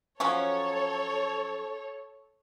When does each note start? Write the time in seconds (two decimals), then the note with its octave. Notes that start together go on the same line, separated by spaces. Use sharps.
0.20 F3 F#3 C#4 A4 C#5